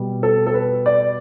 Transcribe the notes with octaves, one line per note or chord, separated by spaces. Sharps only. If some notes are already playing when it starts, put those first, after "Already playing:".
Already playing: B2 G3
A4
A4
B4
D5